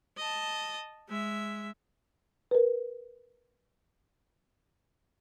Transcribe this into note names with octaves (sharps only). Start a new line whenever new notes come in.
D#5 A5
G#3 E5
A#4 B4